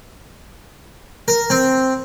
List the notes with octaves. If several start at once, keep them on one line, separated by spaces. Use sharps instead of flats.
A#4
C4